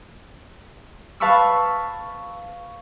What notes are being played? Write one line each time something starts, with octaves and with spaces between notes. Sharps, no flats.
B4 F5 A5 B5 C#6 E6